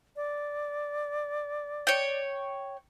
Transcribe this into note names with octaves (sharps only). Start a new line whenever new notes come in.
D5
C#5 G5